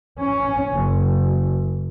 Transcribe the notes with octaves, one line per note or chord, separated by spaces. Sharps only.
C#4
F#1